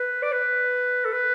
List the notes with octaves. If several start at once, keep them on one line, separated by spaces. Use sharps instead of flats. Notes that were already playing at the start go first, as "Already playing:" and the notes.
Already playing: B4
D5
B4
A4
B4